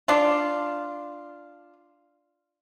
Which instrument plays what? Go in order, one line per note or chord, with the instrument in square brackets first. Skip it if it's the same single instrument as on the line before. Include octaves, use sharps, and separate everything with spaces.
[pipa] D4 F4